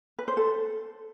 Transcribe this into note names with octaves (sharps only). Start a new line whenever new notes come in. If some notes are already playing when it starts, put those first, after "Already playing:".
B4
C5
A4